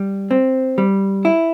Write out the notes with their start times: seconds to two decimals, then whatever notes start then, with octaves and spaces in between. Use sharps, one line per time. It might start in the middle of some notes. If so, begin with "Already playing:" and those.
Already playing: G3
0.31 C4
0.78 G3
1.25 E4